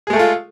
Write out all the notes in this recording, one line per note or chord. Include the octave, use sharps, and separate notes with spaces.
G#3 A3 F4 G#4 A4